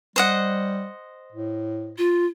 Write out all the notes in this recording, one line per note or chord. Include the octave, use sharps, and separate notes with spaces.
G3 C5 D#5 F#5
A2
F4